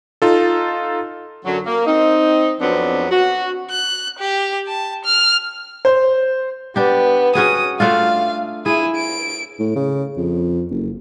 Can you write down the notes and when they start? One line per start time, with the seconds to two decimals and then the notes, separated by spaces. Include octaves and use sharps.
0.22 D#4 F4 A4
1.45 F#2 D3 F#3
1.66 A#3
1.86 C4 D#4
2.60 F2 F#3 B3 C4 D4
3.11 F#4
3.71 F#6
4.19 G4
4.68 A5
5.05 F6
5.85 C5
6.76 B3 D4 G4
7.35 C#4 F#4 G#4 D#6
7.80 A3 D4 F4 F5
8.66 E4 G#4 D#7
8.95 D7
9.59 A2
9.75 C#3
10.17 F2
10.71 F#1